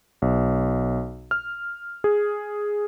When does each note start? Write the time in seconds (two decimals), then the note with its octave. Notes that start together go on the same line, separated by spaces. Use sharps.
0.22 B1
1.31 F6
2.04 G#4